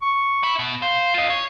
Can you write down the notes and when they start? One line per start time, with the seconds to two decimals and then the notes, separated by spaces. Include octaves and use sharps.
0.02 C#6
0.43 E5 B5
0.59 B2
0.82 C5 F5
1.14 F4 D#5
1.30 C#5